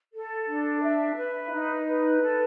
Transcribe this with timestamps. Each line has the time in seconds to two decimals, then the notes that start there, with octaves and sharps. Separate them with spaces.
0.12 A4
0.46 D4
0.81 E5
1.16 B4
1.51 D#4
1.87 B4
2.21 A4